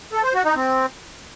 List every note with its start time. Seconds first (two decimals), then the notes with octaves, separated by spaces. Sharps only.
0.12 A4
0.23 C5
0.34 F#4
0.45 D#4
0.55 C4